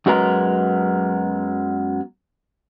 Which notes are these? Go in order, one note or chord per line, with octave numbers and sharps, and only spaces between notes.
F#2 F#3 G#3 B3 A#4